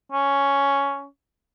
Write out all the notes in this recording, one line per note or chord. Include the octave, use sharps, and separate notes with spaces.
C#4